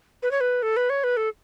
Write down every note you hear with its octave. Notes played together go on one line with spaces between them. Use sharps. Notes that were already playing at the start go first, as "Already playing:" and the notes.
B4
C#5
B4
A4
B4
C#5
B4
A4